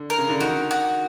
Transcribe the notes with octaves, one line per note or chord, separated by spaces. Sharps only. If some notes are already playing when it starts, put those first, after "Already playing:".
Already playing: D3
A#4
C#3
D3
D#3 F#4
F#4